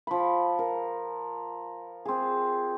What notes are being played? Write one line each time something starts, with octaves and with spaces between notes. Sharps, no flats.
F3 B5
A#4
C4 G#4